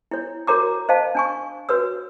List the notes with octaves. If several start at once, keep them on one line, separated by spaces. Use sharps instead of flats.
E4 C#5
F#4 A#4 C#5 A#5 D6
C5 D#5 F5 A5
D4 G#5 C#6
F#4 B4 C#5 E6